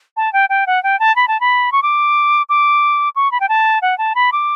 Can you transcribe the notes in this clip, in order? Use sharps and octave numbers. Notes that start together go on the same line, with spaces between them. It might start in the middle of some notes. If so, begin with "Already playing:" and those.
A5
G5
G5
F#5
G5
A5
B5
A5
B5
C#6
D6
D6
C#6
B5
G5
A5
F#5
A5
B5
D6